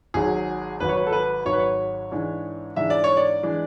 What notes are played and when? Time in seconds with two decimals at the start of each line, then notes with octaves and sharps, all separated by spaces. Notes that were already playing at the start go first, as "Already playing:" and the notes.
0.14 G#1 G#2 F#3 G#4
0.80 G#1 G#2 F#3 B4
0.89 C#5
0.97 B4
1.07 A4
1.13 B4
1.45 G#1 G#2 F#3 C#5
1.53 B4
1.60 C#5
2.11 G#2 E3 G#3 D4
2.76 G#2 E3 G#3 D4 E5
2.90 D5
3.04 C#5
3.17 D5
3.43 E3 G#3 D4